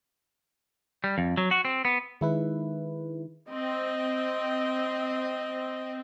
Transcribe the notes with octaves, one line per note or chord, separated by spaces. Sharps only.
G3
F2
F#3
F#4
C4
B3
D#3 G#3 E4 B4
C4 D#5